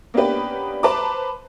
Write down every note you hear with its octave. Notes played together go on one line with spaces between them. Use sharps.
A#3 B3 C#4 D4 G4 B4
B4 C5 A5 A#5 D6